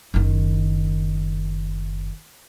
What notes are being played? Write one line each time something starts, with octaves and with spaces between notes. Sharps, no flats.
F#1 D#3